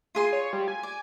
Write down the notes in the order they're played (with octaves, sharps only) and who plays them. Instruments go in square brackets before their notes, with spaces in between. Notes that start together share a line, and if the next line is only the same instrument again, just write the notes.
[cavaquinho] F4 G#4 C6
[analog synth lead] C#5
G3
G#5
[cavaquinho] D5